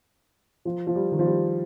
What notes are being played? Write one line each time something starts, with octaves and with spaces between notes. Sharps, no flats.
F3
F3
G3
D#3
F3
G3